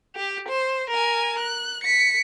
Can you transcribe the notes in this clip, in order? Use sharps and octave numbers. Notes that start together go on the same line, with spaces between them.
G4
C5
A#4 G#5
F#6
B6 C#7